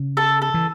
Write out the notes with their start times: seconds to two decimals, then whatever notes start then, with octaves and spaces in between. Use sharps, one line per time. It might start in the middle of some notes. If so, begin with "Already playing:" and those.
Already playing: C#3
0.17 A4
0.42 A4
0.54 E3